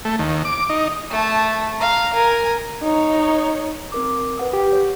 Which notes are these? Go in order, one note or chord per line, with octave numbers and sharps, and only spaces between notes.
A3
D#2
D6
D#4
A3 A5
F5 A#5
A#4 G#5
D#4 C#5
C4 A#4 D6
B4 F#5 D#6
G4
C#5